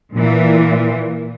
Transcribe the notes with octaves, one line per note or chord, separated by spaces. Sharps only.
A#2 E3